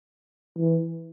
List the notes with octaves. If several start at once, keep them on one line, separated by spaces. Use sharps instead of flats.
E3